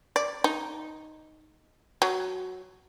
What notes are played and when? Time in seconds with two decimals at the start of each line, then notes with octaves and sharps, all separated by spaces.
0.16 D5
0.44 D#4
2.02 F#3